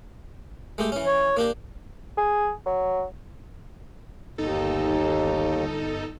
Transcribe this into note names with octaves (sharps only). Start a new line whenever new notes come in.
G#3 A3 G4
E3 C#4
C#5
A#3 D4 G4
G#4
F#3
G1 D#2 D#4 A4